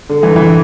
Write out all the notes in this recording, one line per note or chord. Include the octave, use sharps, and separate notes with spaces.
D3
E3
E3